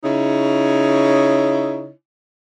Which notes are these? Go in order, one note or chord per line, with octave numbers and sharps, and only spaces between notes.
C#3 D#4 E4 C#5